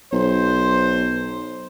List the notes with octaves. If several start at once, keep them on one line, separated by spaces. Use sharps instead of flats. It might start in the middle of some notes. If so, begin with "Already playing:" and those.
B1 C5